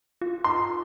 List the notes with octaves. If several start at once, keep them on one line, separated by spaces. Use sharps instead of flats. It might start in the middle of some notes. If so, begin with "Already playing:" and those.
F4
C6